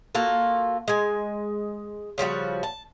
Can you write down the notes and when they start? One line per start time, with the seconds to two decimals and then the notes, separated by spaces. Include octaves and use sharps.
0.15 A#3 F4 F#4 A4
0.88 G#3 G#5
2.18 C#3 F3 G3 F#4
2.63 A5